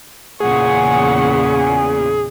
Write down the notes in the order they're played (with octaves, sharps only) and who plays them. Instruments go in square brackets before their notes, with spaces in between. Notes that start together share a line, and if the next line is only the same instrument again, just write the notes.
[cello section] E2 A#2 C#3 [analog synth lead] G#4 [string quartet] F#5 C#6